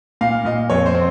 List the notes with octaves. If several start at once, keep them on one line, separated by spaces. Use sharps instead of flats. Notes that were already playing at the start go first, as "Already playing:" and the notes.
A#2 F5
A#2 D#5
F2 C#5
C5
C4